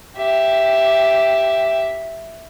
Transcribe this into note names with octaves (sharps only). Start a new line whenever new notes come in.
G4 E5